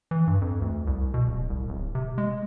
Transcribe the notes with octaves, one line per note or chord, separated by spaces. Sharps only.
E3
G2
F2
D2
C2
B2
D1
C2
D1
C3
G#3